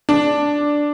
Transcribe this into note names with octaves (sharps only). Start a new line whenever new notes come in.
D4